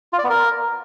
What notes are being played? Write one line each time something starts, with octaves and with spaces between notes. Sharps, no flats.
F4
D5
B3
A#4